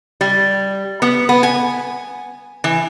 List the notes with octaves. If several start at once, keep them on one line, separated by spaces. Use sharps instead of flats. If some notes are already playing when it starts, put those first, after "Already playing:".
G3
B3
B3
G#5
E3